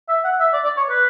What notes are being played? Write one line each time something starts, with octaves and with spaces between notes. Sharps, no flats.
E5
F#5
E5
D5
D5
C#5
B4